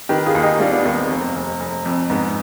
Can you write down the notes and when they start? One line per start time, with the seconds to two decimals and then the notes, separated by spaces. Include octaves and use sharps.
0.09 D#3 G4 B4
0.26 F4 G#4
0.35 D#2
0.43 D#4 G4
0.60 G3 D4 F4
0.72 B3 D4
0.85 D#2 B3
0.98 C4
1.10 F1
1.35 F1
1.60 F1
1.86 F2
2.10 G#2 B3